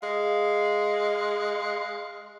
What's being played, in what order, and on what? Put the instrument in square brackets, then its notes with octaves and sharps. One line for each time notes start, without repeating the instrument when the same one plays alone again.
[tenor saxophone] G#3 [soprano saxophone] F5